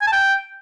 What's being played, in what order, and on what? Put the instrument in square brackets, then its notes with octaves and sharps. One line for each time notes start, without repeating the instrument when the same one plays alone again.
[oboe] G#5
A5
G5